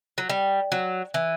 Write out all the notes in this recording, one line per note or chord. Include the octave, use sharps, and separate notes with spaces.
F#3
G3
F#3
E3